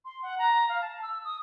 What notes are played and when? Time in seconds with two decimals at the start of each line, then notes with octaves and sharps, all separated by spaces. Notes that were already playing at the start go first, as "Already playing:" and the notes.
0.05 C6
0.22 F#5
0.39 A#5
0.69 F5
0.82 A5
1.02 E6
1.25 D#6